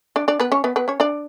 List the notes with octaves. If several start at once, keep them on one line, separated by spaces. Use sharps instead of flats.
D4 D5
D4 D5
B3 B4
C#4 C#5
B3 B4
B3 B4
C#4 C#5
D4 D5